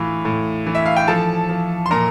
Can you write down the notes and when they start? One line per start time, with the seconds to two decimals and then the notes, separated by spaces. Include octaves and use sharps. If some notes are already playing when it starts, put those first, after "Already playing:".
Already playing: A2 E3 F4
0.25 A2
0.66 E3
0.75 E5
0.86 F5
0.96 G5
1.08 F3 A4 A5
1.49 F3
1.86 C6
1.91 A#2 A#4 A#5